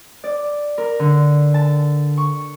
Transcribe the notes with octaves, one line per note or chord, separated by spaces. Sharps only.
D5
A#4
D3
A5
C#6